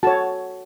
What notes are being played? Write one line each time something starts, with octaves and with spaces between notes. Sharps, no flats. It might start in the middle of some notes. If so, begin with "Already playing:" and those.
F#4 A4 C#5 A5